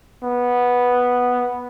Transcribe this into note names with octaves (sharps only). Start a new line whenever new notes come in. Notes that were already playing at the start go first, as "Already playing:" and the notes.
B3